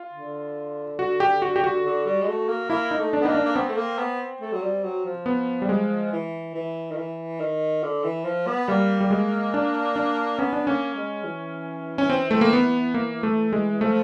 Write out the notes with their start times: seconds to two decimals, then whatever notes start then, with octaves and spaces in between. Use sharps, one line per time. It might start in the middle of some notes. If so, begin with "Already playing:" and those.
Already playing: F4
0.13 D3
0.99 F#4
1.20 G4
1.42 F#4
1.56 G4
1.64 F#4
1.85 D3
2.06 G3
2.22 G#3
2.28 A3
2.49 A#3
2.70 A#3 E4
2.91 D#4
2.99 A3
3.13 D4
3.21 B3
3.25 A#3 D#4
3.35 D4
3.46 A#3
3.55 B3 C4
3.69 A3
3.77 A#3
3.98 B3
4.41 A3
4.52 F#3
4.62 G3
4.84 F#3
5.05 F3
5.26 B3
5.62 G3
5.69 G#3
6.12 E3
6.54 E3
6.91 D#3
6.97 E3
7.40 D#3
7.83 D3
8.04 E3
8.25 F3
8.47 B3
8.68 G3 A#3
9.01 G3
9.10 G#3
9.54 D4
9.96 D4
10.39 B3 C#4
10.53 D4
10.67 A#3 C#4
10.95 G#3
11.24 E3
11.98 C#4
12.10 C4
12.31 A3
12.41 A#3
12.53 B3
12.94 A#3
13.23 A3
13.53 G#3
13.81 F3 A3